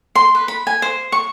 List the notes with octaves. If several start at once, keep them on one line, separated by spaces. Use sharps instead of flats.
C6
B4
B5
G#5
C5
C#6